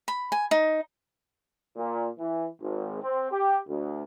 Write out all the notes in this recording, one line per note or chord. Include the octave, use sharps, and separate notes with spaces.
B5
G#5
D#4
A#2
E3
G#1
C4
G4
D2